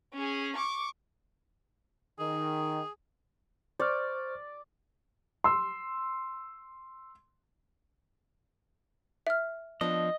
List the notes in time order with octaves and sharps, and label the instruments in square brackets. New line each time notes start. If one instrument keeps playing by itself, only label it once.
[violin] C#4 G#4
C#6 D6
[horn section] D#3 [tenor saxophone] G#4
[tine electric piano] C5 C#6 F6 [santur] D5
[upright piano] C6 E6
[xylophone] E5 F6
[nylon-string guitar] F3 B3 D4 [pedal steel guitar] D#5